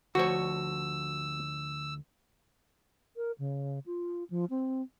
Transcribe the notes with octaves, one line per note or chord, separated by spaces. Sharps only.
D2 F3 F#4 C#5 E6
A#4
C#3
F4
F3
C4